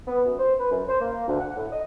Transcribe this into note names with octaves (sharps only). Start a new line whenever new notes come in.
B3
F#2
C5
B4
F#2
C5
A#3
D2
F#5
A2
D#5